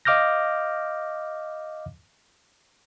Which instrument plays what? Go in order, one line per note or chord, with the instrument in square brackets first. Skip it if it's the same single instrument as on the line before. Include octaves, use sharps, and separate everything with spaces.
[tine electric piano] D#5 F5 D6 F6 G6 A#6